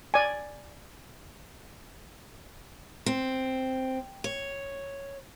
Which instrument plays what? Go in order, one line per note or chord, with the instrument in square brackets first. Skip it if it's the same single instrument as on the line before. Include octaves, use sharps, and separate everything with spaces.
[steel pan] D5 G#5
[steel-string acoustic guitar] C4
C#5